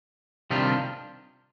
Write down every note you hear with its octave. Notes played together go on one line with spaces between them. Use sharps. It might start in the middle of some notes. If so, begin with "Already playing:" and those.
C3 D#3 G3 D4 F4